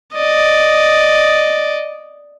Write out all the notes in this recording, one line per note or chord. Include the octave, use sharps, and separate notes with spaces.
D5 D#5